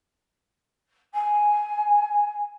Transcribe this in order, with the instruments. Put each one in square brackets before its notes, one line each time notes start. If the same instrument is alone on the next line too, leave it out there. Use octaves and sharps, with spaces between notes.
[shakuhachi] G#5